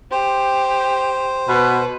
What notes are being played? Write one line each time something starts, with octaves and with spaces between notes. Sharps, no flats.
G4 C5
B2 B4